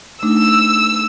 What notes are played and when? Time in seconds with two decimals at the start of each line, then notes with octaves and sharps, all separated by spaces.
0.23 A3 D4 D#4 E6